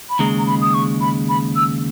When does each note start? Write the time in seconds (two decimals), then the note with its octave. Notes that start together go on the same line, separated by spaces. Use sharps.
0.10 B5
0.19 D#2 C#3 G#3 A#5
0.38 A#5
0.47 B5
0.61 D#6
0.74 C#6
1.01 B5
1.29 B5
1.56 E6